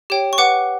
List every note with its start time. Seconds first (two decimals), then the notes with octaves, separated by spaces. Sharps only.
0.10 G4 C#5 G5
0.33 C#6
0.38 B4 F#5 D6